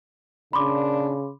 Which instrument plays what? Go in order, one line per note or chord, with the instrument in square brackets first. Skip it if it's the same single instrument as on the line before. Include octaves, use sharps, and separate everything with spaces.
[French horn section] A#2 D4 [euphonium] C#3 [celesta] B5 C6 D6